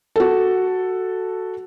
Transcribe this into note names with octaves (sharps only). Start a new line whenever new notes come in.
F#4 A4